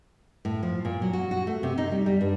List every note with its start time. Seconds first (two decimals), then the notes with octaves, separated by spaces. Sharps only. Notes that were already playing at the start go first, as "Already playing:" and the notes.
0.45 A2
0.63 F3
0.85 A#2
1.02 F#3
1.13 F#4
1.31 F#4
1.47 A3
1.63 C3
1.78 D#4
1.92 G3
2.06 G3
2.21 G2